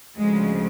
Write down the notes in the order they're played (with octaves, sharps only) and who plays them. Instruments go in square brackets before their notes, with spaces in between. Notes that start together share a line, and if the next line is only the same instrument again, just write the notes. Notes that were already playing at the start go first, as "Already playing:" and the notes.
[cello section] D2 C#3 F3 G#3